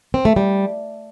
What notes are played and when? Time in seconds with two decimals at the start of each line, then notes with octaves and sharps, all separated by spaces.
0.14 C4
0.25 A3
0.36 G3